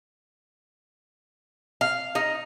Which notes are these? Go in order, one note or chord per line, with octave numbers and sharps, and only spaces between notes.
F5
D#4